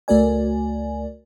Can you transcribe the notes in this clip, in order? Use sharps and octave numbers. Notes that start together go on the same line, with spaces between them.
C#2 A3 F#4 A#4 D5 G#5